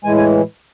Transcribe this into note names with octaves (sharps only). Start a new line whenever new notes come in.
A2 E3 G#3 G#5
G#5